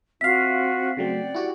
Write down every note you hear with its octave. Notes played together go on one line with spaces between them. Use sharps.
C4 F4 F#4 E5 F5 B6 C7
C#3 F#3 A3 D5 F#5 G5
E4 F#4 G4